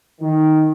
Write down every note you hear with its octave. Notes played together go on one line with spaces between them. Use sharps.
D#3